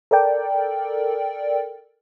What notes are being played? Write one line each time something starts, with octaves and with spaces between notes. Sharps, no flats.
A4 A#4 D5 G5